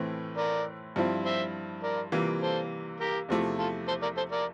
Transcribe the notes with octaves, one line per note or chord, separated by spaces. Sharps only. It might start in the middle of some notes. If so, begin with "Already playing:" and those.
Already playing: A2 E3 A3 C4
A#4 D5
G2 F3 C4 E4
C5 E5
A#4 D5
C3 E3 G3 A#3 F4
A4 C5
G4 A#4
E2 C3 F3 A3 E4
F4 A4
A4 C5
A#4 D5
A4 C5
A#4 D5